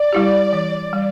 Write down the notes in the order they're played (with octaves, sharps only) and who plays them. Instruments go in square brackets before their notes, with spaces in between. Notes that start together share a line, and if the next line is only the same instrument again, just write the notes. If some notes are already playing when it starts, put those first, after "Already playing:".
Already playing: [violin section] D5
[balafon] G3 E4 G4
E3
G3